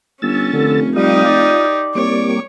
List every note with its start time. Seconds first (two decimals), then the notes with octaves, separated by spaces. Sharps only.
0.22 G1 C#4 E6 A6
0.53 F1 D3
0.96 G3 D#4 F4 G4 D#6
1.25 D5
1.95 C2 G3 A#3 C#5 D6